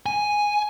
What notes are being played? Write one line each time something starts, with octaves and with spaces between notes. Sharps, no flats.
G#5